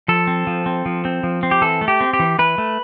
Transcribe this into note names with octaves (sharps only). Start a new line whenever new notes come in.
F3 A4
C4
F3
C4
F3
C4
F3
C4
G4
E3 A4
A3
G4
C4
G4
E3
E3 B4
A3